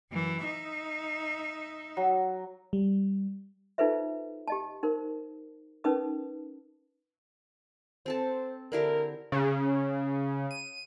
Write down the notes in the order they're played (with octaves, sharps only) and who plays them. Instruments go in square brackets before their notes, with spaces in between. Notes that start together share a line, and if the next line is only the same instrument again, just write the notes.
[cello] F#2 E3
D#4 E5
[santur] F#3
[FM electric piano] G3
[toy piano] D#4 F4 A4 B4 C5 E5
G4 D#5 A5
D#4 A#4 C5
C#4 D#4 A#4 B4 A5 D#6
[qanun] C4 A4 A5 [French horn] C5
[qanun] D3 E4 G4 [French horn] A#4
[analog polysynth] C#3
D#7